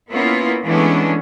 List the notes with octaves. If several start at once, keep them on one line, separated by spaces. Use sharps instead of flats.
A#3 B3 C#4 E4 F4
E3 G#3 A3 B3 C#4 D4